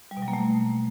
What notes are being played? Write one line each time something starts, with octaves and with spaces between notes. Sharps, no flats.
G3
B2
F#3
A#3
A3